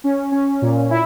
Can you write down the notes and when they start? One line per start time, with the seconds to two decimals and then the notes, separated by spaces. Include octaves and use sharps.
0.04 C#4
0.32 C#4
0.62 A#2
0.90 E4